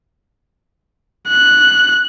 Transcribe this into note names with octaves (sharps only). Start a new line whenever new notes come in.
F#6